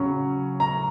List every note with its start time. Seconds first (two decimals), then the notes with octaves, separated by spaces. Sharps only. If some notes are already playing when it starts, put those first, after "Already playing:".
Already playing: C#3 F#3 C#4 C#6
0.60 A#5